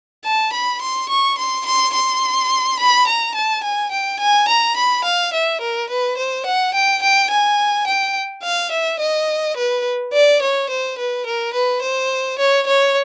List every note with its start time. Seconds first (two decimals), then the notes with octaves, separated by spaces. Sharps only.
0.24 A5
0.53 B5
0.81 C6
1.09 C#6
1.38 C6
1.66 C6
1.94 C6
2.79 B5
3.07 A#5
3.35 A5
3.63 G#5
3.91 G5
4.20 G#5
4.48 A#5
4.76 B5
5.04 F5
5.33 E5
5.61 A#4
5.89 B4
6.18 C5
6.46 F#5
6.74 G5
7.02 G5
7.30 G#5
7.87 G5
8.43 F5
8.71 E5
9.00 D#5
9.57 B4
10.13 D5
10.42 C#5
10.70 C5
10.98 B4
11.26 A#4
11.53 B4
11.82 C5
12.39 C#5
12.67 C#5